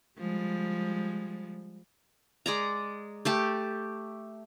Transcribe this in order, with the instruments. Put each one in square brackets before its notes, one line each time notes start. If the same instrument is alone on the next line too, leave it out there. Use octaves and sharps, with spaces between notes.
[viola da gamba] F3 G3 G#3
[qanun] G#3 D5 A#5
A3 G4 A5